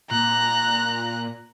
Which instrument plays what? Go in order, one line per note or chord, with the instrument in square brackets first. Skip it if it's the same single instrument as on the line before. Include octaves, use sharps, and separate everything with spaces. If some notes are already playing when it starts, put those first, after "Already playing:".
[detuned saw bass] A#2 [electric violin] A#5 F#6